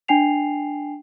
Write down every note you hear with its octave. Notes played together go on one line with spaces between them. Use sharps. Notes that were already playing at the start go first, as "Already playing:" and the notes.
D4 G5 G#5 C7 F7